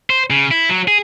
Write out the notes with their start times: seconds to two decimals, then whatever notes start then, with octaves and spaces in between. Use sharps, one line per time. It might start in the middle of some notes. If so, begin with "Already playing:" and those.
0.10 C5
0.30 C#3
0.51 E4
0.69 F#3
0.88 G#4